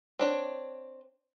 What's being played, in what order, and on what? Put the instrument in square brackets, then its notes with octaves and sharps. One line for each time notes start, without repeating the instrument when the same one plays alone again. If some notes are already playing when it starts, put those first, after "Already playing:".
[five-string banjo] C4 D4 C#5